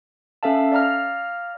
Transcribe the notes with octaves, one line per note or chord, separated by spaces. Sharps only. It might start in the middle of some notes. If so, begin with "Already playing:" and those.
C#4 A4 E5 F5 A5
D5 F5 A#5 F6